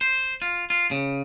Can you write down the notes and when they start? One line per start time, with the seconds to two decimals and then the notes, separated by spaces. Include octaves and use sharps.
0.01 C5
0.42 F4
0.70 F4
0.91 C#3